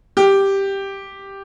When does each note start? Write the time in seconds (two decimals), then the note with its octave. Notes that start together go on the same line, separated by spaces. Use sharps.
0.17 G4